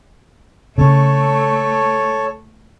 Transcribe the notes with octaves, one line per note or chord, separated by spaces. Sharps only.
C#3 A3 A4 C#5